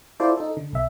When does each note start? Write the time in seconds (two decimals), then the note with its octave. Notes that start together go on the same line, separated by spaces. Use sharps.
0.20 E4 F4 A4 C5 D5
0.37 D#4 A4
0.57 D3
0.73 B1 E5